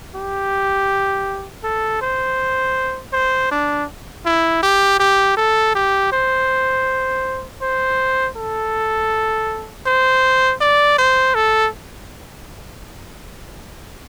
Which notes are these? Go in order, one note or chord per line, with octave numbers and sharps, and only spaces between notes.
G4
A4
C5
C5
D4
E4
G4
G4
A4
G4
C5
C5
A4
C5
D5
C5
A4